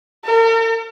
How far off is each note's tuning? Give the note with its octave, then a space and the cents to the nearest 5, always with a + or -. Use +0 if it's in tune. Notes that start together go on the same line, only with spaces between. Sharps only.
A#4 -40